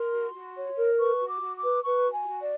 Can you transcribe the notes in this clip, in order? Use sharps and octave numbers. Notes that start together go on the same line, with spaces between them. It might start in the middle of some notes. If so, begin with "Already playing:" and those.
Already playing: A#4 C6
F#4
F#4
C#5
A#4
B4 C#6
F#4
D6
F#4
D6
B4
B4 C#6
F#4
G#5
F#4
D5